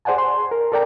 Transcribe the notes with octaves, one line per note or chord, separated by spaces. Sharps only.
G#4 C5 D5 F#5 G#5 A5
C6
A#4
A4 A#4 D5 G5 A#5